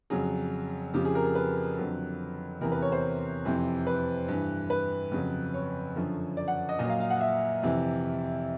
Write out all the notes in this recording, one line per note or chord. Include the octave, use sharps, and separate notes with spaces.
F2 C#3 F#3 G#4
F2 C#3 F3 G4
G#4
A#4
A#4
B4
F2 D3 F#3
E2 C3 E3 A#4
B4
C#5
C5
F2 C3 E3
B4
G2 E3
B4
F2 C#3 F#3
C#5
F#2 D3 F3
D5
F#5
D#5
A#2 F#3 D#5
F5
F5
F#5
E5
F2 C3 E3